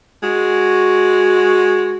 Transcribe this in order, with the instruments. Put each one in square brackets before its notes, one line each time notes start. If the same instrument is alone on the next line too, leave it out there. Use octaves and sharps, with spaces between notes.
[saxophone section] G#3 F#4